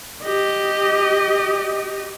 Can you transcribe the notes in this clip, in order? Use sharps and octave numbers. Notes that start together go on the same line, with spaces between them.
G4 D#5